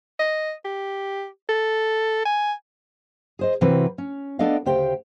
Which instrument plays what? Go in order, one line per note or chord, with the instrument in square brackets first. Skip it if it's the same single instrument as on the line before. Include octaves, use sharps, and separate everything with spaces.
[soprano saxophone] D#5
G4
A4
G#5
[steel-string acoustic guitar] G#4 C5 D#5
C3 E3 C4 F#4 A#4 B4
C#4
B3 D4 A4 D5 D#5 F5
D2 C#3 G4 C5 G5